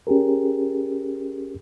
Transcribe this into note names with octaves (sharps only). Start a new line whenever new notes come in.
C#4 G4 G#4 A#4